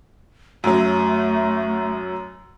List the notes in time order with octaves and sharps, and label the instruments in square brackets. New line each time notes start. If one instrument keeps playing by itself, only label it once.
[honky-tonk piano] F#2 F#3 [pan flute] A3